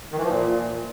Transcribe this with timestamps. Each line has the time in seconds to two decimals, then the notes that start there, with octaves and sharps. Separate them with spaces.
0.12 D#3
0.18 E3
0.24 F3
0.30 A#2